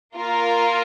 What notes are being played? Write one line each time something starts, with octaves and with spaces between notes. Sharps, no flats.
A#3 F4 A#4